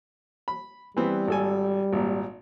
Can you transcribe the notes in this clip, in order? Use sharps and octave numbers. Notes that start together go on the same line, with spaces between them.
B5
E3 G3 B3 C4
G#1 A4 G#5
G#1 A#2